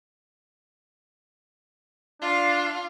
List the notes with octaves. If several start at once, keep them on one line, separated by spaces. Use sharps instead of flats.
D4 F4 F5